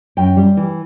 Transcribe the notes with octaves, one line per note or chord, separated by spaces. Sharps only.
F#2 G5
G3
E3